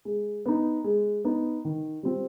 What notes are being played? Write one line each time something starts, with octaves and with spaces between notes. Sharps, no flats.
G#3
B3 D#4
G#3
B3 D#4
D#3
G3 C4 F4